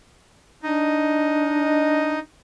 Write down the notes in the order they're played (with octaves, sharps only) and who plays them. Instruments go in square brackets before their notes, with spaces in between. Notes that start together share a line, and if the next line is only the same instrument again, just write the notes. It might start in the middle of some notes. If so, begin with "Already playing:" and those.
[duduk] D4 [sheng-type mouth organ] D#4 D#5